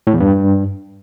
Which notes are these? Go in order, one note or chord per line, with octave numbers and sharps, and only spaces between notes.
A2
E2
G2